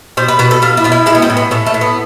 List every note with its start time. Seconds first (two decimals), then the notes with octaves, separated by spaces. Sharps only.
0.17 B2 C5
0.28 B4
0.39 B2 B4
0.51 A4
0.62 B2 F4
0.77 E4
0.84 B2 F4
0.92 E4
1.06 G#3 E4
1.15 B3
1.22 C4
1.30 A2
1.37 B3
1.51 A2 A3
1.66 A3
1.74 A2
1.81 B3